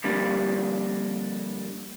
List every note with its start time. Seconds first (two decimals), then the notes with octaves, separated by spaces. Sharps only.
0.04 F2 D3 G3 A#3 D4